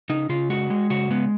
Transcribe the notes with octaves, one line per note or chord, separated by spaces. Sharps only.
C#3 D#4
C#3 F4
G#3 F#4
G#3
C#3 F#4
G#3 B3